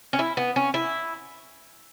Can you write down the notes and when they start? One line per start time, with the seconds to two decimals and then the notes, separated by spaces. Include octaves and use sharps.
0.13 C#4
0.19 E4
0.37 B3
0.56 C#4
0.74 E4